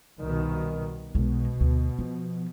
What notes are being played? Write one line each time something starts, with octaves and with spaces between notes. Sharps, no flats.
C2 B2 D#3
B1 B2 G#3
D2
F3